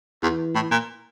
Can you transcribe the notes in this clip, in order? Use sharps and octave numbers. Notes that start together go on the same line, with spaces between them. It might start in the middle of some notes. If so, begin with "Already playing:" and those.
E2 E3
A2
A#2